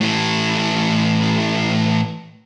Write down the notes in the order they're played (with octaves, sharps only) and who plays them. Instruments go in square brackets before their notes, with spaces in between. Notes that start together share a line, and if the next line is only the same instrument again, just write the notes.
[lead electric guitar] A2 E3